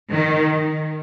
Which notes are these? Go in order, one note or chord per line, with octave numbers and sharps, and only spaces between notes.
D#3